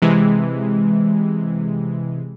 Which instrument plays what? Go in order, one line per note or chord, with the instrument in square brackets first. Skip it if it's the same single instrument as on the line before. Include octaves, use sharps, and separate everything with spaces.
[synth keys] C3 E3 G#3